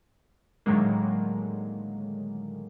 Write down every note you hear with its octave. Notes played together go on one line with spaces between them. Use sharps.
A2 D3 D#3 F#3 G#3 A#3